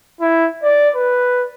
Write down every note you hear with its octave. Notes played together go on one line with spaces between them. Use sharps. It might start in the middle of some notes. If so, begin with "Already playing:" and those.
E4
D5
B4